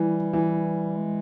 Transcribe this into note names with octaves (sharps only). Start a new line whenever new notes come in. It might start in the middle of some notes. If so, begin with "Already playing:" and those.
Already playing: E3 G3
E3
G#3